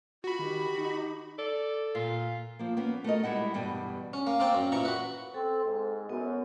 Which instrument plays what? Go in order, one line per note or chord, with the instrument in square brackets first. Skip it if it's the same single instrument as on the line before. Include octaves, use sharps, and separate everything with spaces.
[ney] F4 [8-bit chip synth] F#4 B5
[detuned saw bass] D#3 [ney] G4
[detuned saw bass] D#4
[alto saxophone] A4 [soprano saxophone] D5
[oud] A#2 [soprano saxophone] F4
[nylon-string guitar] F3 A#3
A#3 B3 C#4
A3 F#4 A#4 D#5
G3 G#3 E4 D#5 F#5
E2 G2 B2 G3
[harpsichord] C#4
A#3
A#3 C4 D5 G5
F#2
A#2 E3 A#5 C#6
F#4 B4
[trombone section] C4 [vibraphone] A4
[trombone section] G#2
[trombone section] F#2 [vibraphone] B3